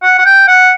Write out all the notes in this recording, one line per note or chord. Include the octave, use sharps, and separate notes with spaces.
F#5
F#5
G5
F#5